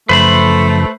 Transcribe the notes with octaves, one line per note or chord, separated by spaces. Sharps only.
F#2 C#3 F3 A3 B4 C5 B5